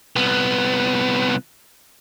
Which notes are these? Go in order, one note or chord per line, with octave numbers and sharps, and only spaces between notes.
C2 B3